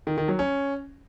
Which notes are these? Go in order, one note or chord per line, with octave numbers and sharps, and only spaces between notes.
D#3
D#3
F#3
C#4